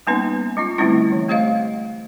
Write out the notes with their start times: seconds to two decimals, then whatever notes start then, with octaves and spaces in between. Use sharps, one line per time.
0.07 G3 A#3 B3 C#4 D#4 B4
0.57 G#3 C#4 F4
0.78 D3 G3 A3 C4 C#4 E4
1.12 E3
1.29 A3 G4 C5 D#5 F5